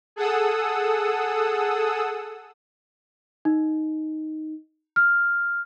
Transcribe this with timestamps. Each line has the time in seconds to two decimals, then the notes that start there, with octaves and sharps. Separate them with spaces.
0.16 G#4 A4 F#5 D#6 E6
3.45 D#4
4.96 F6